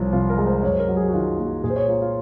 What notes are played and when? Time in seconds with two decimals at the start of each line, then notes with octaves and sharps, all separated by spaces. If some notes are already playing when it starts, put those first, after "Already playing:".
Already playing: C2 F3 C#5
0.13 C3 F4
0.30 A#4
0.38 G#3
0.47 C5
0.63 F#2 C#5
0.72 C5
0.80 A#4
0.88 F#3
0.96 G#4
1.08 F#4
1.13 D#3 F4
1.38 A#3 F#4
1.64 A#2 G#4
1.70 C5
1.76 C#5
1.89 A#3 F4
2.02 F4